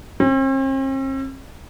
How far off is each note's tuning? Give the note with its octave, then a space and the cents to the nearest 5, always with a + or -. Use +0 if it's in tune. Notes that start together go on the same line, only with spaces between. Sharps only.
C4 +45